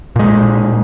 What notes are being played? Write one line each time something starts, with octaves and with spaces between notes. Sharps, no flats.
A#2 G#3